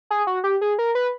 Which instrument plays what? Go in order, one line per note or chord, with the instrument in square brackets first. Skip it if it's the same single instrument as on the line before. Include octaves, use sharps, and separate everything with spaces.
[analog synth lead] G#4
F#4
G4
G#4
A#4
B4